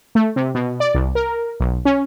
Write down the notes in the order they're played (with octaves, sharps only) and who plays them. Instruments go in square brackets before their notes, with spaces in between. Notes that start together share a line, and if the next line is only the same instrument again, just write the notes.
[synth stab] A3
C3
B2
D5
C2
A#4
B1
C#4